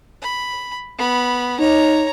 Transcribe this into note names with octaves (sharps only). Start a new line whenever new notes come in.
B5
B3 B5
D#4 C#5 A#5